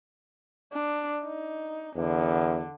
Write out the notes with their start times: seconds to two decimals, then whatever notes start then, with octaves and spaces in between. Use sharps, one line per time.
0.73 D4
1.24 D#4
1.96 E2 D3